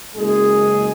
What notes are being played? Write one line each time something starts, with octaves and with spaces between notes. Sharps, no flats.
F#1 G#3 G#4